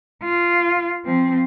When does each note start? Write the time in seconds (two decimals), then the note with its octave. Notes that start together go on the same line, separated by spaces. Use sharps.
0.24 F4
1.05 F3 C4